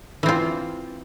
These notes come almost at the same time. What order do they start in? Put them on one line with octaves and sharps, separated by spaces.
E3 C4 F4